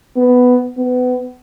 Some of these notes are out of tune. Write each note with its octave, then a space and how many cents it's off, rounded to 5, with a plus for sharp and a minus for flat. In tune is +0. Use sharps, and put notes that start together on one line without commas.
B3 +10
B3 +25